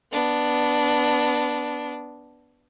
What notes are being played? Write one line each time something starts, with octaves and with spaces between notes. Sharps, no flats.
B3 D4